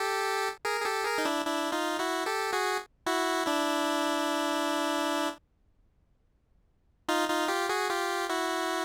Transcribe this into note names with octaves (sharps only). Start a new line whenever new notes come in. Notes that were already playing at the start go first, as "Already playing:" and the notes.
Already playing: G4 A4
G#4 A#4
G#4
G4 A4
G#4 A#4
D#4
D4 E4
D4 E4
D#4 F4
E4 F#4
G4 A4
F#4 G#4
E4 F#4
D4 E4
D#4 F4
D#4 F4
F4 G4
F#4 G#4
F4 G4
E4 F#4